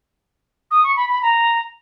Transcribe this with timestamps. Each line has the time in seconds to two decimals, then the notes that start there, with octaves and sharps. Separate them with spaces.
0.71 D#6
0.83 C#6
0.96 B5
1.09 B5
1.22 A#5